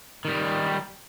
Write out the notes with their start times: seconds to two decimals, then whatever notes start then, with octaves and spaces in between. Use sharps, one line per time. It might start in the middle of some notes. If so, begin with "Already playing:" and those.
0.25 D#3 G3